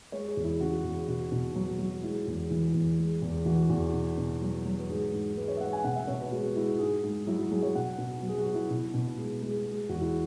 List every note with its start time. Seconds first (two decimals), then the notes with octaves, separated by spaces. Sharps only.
0.12 G#3 C#5
0.28 G#4
0.37 E2
0.44 E4
0.60 C#3 F#4
0.84 E2
1.08 B2 F#4
1.32 B2
1.55 F#3
1.79 F#3
2.03 G#3 E4
2.27 E2
2.50 E3
2.74 E2
2.98 G#3
3.22 E2
3.45 E3 F#4
3.70 E2
3.93 B2
4.18 B2
4.41 F#3
4.66 F#3
4.78 B4
4.89 G#2 G#4
5.12 G#2
5.36 G#3 B4
5.48 C#5
5.57 E5
5.60 G#3 F#5
5.73 G#5
5.84 B2 F#5
5.96 E5
6.07 B2 C#5
6.20 B4
6.32 G#3 F#4
6.56 G#3 E4
6.79 G#2 G#4
7.03 G#2
7.27 F#3 E4
7.39 F#4
7.51 F#3 G#4
7.63 C#5
7.75 B2 F#5
7.98 B2
8.22 F#3
8.29 G#4
8.38 F#4
8.46 F#3
8.54 E4
8.70 B2
8.94 B2
9.18 G#3
9.42 G#3
9.66 G#3
9.89 E2 F#4
10.01 E4